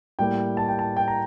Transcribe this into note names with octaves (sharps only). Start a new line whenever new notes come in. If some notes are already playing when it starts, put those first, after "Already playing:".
A2 G3 A#3 G5
A5
G5
A5
G5
A#5